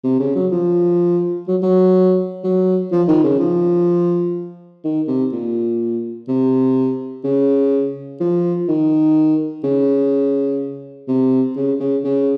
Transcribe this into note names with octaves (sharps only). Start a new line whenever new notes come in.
C3
C#3
F#3
F3
F#3
F#3
F#3
F3
D#3
C#3
F3
D#3
C3
A#2
C3
C#3
F3
D#3
C#3
C3
C#3
C#3
C#3